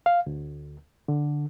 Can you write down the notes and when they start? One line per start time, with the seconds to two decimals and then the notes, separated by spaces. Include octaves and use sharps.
0.06 F5
0.27 D2
1.08 D3